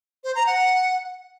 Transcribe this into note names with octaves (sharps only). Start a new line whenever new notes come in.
C5
A#5
F#5